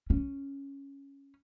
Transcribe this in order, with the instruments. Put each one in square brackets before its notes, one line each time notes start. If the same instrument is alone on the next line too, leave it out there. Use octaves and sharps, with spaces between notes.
[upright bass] C#4